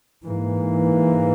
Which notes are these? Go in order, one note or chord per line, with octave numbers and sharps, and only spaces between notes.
G#2 E3 A#3